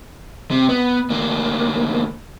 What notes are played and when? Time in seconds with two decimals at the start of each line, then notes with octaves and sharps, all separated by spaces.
0.51 C3
0.69 B3
1.10 D2 A#3